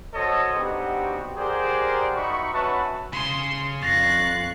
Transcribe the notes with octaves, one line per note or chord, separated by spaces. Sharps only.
F#4 A4 C5 C#5 D#5
B3 C4 D4 D#4 F#4 G4
G4 G#4 A#4 C5 D5 F#5
D#4 F#4 E5 B5 C#6
C#4 F#4 B4 E5 F#5 A5
C#3 C6
F2 F5 C#6 F#6 A6 A#6 C7